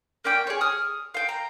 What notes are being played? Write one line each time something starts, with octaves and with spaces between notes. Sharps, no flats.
A#3 C#4 D5 G5
G#4 C#5
D#6 F6
F5 G5
A#5